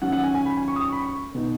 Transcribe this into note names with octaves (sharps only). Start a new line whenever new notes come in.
D#3 F#3 C#4 F#5
F#5
G#5
G#5
B5
G#5
C#6
D#6
C#6
B5
C#6
B2 B3 D#4